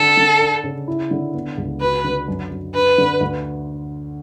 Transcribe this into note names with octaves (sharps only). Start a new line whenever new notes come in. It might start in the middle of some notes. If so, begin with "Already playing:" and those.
Already playing: D3 A4
D3
D4
C#3
E4
D3
B3
C#2
F#4 B4
D3
F#2
F#2
D4 B4
D3
D2